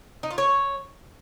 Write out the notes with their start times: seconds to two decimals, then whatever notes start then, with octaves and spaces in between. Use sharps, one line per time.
0.23 D#4
0.31 F4
0.38 C#5